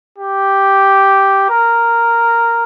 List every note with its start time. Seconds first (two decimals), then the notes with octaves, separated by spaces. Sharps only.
0.18 G4
1.50 A#4